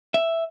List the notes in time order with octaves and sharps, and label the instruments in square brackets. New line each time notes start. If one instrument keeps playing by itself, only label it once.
[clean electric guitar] E5